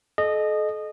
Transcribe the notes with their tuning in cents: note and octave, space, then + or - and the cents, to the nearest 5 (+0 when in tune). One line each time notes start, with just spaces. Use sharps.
A4 -40 D#5 -20